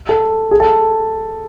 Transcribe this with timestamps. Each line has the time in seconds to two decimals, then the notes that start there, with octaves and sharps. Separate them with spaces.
0.09 A4
0.51 G#4
0.60 A4